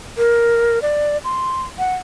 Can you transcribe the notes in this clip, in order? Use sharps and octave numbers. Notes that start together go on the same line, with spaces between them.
A#4
D5
C6
F#5